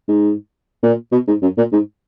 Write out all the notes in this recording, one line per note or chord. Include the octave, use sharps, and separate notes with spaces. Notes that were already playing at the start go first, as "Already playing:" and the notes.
G#2
A#2
B2
G#2
F#2
A#2
G#2